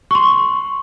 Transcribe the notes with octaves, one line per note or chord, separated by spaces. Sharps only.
C6 C#6